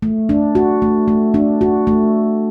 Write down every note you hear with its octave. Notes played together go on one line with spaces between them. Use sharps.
A3
D4
F#4
A3
A3
D4
F#4
A3